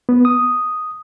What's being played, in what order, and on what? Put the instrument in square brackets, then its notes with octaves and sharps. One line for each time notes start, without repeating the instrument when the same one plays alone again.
[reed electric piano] B3
D#6